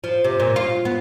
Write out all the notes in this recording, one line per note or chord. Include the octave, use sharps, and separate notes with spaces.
F3
C3
A#2
F4
B3